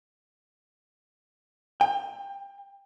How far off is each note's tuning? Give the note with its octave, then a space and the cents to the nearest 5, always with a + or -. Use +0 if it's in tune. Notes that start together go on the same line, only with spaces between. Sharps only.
G5 +25